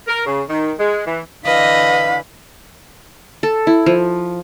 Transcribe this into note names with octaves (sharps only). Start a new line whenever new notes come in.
A#4
C#3
D#3
G#3
E3
D3 E3 B4 D#5 F5 B6
A4
E4
F3